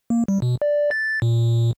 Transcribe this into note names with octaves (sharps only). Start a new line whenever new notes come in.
A#3
G3
B2
D5
A6
A#2